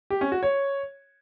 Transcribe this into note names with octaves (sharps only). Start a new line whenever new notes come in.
G4
C#4
F#4
C#5